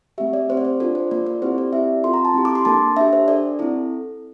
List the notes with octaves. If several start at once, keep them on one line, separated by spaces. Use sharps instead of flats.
A3 C4 G4 E5
D5
C4 G4 C5
D5
C5
D4 F4 A4 D5
C5
A#3 F4 A4 D5
D5
C4 E4 G4 C5
D5
C4 E4 G4 E5
C4 F4 A4 C6
A#5
A5
C4 E4 G4
D6
C6
A#3 D4 A4 A5
D4 G4 E5
C5
D4 A4 D5
C4 E4 A4